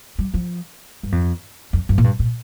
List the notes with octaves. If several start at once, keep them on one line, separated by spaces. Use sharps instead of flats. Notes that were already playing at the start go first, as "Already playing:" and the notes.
G3
F3
G2
F2
F2
G2
A#2
G2
A#2